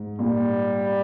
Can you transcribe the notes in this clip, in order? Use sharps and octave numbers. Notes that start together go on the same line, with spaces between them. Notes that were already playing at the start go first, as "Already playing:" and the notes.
Already playing: G#2
A#2 G3